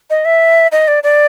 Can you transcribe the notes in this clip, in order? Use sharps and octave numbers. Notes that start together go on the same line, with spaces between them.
D#5
E5
D#5
D5
D5